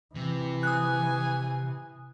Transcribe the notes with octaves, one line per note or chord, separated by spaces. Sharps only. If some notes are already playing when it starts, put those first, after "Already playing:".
C3 E3
G#5 D#6 F#6